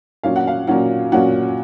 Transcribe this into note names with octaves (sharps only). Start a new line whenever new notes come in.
A#2 F#3 C#4 F4 F5
F#5
F5
A#2 F#3 C#4 F4 F#5
A#2 F#3 C#4 F4 F#5